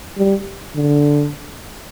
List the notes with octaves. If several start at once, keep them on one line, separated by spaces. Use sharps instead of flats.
G3
D3